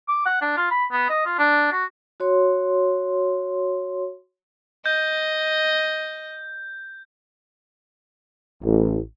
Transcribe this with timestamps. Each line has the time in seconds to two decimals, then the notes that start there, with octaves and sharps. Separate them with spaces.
0.08 D6
0.25 F#5
0.41 D4
0.57 F4
0.71 B5
0.92 B3
1.09 D#5
1.26 F4
1.38 D4
1.72 F#4
2.20 F#4 C#5 C6
4.86 D#5 G6
8.63 A1